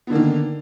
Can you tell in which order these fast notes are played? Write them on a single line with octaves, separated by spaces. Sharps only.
B3 D3 A#3 D#3